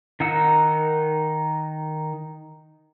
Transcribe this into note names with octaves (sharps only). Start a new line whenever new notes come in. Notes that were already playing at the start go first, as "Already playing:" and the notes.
D#3 D#4 A#4 F#5 E6